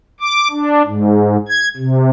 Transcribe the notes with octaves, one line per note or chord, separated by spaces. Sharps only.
D6
D4
G#2
G#6
C3